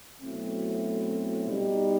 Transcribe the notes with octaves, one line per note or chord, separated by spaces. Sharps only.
B2 F#3 A3 C4 E4
B2 G3 D#4 G4